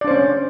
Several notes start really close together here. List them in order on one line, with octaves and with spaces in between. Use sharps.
D5 D4 C5 C#4